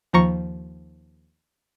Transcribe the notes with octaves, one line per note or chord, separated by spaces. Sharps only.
D#2 F3 A#5 C#6